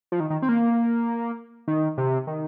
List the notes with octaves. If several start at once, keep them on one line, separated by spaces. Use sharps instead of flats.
F3
D#3
D#3
C4
A#3
D#3
C3
D#3